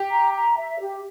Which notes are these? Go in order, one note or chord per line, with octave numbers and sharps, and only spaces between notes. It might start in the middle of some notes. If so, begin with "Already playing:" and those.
Already playing: G4
A#5
A#5
E5
G4